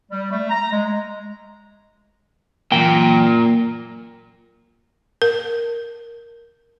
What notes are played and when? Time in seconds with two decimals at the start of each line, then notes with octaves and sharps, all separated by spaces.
0.11 G3
0.31 A3
0.50 A#5
0.72 G#3
2.72 F#2 A#2 E3 G5
5.22 A#4